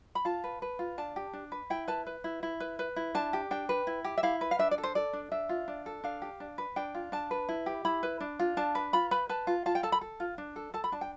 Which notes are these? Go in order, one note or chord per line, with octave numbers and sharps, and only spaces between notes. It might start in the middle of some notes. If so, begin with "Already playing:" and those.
B5
F4 A5
B4
B4
F4
D4 A5
G4
D4
B4
E4 G5
B4 A5
B4
E4
E4
B4
B4
E4
D4 A5
G4
D4 G5
B4
E4
G4
E5
E4 F5
B4
F5
D4 E5
D5
A4
C5
A4 D5
D4
D4 E5
F4
D4
A4
D4 F5
G4
D4
B4
D4 G5
F4
D4 A5
B4
E4
G4
E4 B5
B4
D4
F4
D4 A5
B4
F4 B5
B4 B5
B4 A5
F4
F4 A5
G5
A4 A5
B5
A4
F4
D4
A4
A4 A5
B5
D4 A5
G5